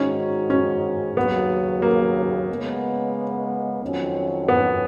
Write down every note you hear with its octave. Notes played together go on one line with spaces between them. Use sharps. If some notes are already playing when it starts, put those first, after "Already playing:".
Already playing: G#2 D#3 G#3 C#4 D#4 F#4
C#4
D#2 C#3 F#3 B3
A#3
C#3 G#3 B3
F2 D#3 F#3 C#4 F4
B3